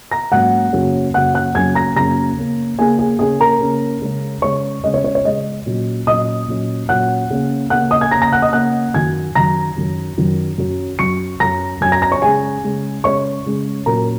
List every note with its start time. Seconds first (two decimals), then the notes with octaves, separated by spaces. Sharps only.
0.11 A#5 A#6
0.32 G#2 F#3 A#3 C#4 F#5 F#6
0.73 F#2 C#3 F#3 A#3 C#4
1.14 F#2 C#3 F#3 A#3 C#4 F#5 F#6
1.34 F#5 F#6
1.55 F#2 C#3 F#3 A#3 C#4 G#5 G#6
1.75 A#5 A#6
1.96 F#2 C#3 F#3 A#3 C#4 A#5 A#6
2.37 C#3 A#3 C#4
2.78 C#3 A#3 C#4 G#4 G#5
2.99 G#4 G#5
3.19 C#3 A#3 C#4 G#4 G#5
3.40 A#4 A#5
3.61 C#3 A#3 C#4
4.02 C#3 G#3 C#4
4.42 C#3 G#3 C#4 C#5 C#6
4.83 C#3 G#3 C#4 D#5
4.94 C#5
5.04 C#5
5.15 C#5
5.24 C#3 G#3 C#4 D#5
5.66 A#2 F#3 C#4
6.07 A#2 F#3 C#4 D#5 D#6
6.48 A#2 F#3 C#4
6.89 A#2 F#3 C#4 F#5 F#6
7.30 C#3 A#3 C#4
7.70 C#3 A#3 C#4 F#5 F#6
7.91 D#5 D#6
8.01 G#5 G#6
8.11 C#3 A#3 C#4 A#5 A#6
8.22 A#5 A#6
8.32 F#5 F#6
8.42 D#5 D#6
8.52 C#3 A#3 C#4 F#5 F#6
8.94 F#2 D#3 F#3 G#5 G#6
9.35 F#2 D#3 F#3 A#5 A#6
9.76 F#2 D#3 F#3
10.18 F#2 D#3 F#3
10.58 F#2 F#3 C#4
10.99 F#2 F#3 C#4 C#6 C#7
11.40 F#2 F#3 C#4 A#5 A#6
11.81 F#2 F#3 C#4 G#5 G#6
11.92 A#5 A#6
12.02 A#5 A#6
12.12 C#5 C#6
12.22 C#3 G#3 C#4 G#4 G#5
12.64 C#3 G#3 C#4
13.04 C#3 G#3 C#4 C#5 C#6
13.46 C#3 G#3 C#4
13.86 A#2 F#3 C#4 A#4 A#5